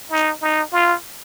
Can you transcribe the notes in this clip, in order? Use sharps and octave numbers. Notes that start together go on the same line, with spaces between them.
D#4
D#4
F4